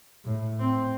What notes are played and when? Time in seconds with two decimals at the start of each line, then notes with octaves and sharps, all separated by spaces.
0.24 A2
0.60 C4